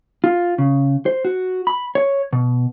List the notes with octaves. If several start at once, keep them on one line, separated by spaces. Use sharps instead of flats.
F4
C#3
C5
F#4
B5
C#5
B2